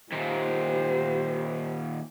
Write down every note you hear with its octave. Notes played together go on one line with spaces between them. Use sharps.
D#2 A#2 G4 C5